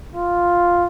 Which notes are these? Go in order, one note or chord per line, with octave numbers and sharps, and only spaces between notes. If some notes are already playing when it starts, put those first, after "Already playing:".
F4